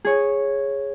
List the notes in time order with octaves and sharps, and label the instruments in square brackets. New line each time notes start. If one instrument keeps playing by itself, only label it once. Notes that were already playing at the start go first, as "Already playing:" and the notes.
[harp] G#4 C#5